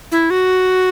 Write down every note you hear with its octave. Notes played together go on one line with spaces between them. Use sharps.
E4
F#4